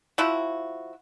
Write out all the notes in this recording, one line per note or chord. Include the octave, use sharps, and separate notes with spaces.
F3 E4 F#4